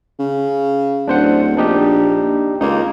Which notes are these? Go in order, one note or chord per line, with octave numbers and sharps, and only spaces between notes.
C#3
D1 D4 C5 F#5
A#1 D4 D#4 G4
C#2 A#3 D#4